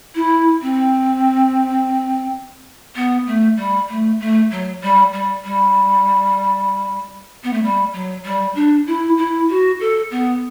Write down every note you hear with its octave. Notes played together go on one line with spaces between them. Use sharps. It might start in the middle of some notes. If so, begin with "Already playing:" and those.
E4
C4
B3
A3
G3
A3
A3
F#3
G3
G3
G3
B3
A3
G3
F#3
G3
D4
E4
E4
F#4
A4
B3